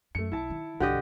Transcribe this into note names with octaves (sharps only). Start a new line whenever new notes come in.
F#2 A3 C#7
B1 E4 A5
D#3
B1 G2 D3 G4 D#5